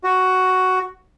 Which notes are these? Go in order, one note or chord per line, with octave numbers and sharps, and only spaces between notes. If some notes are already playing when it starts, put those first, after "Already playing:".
F#4